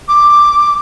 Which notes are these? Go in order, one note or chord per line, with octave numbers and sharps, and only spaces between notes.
D6